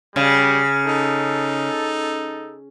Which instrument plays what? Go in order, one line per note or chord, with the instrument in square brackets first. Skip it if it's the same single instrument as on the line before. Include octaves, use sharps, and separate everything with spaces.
[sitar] C#3 [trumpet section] G3
[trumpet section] D#4 A4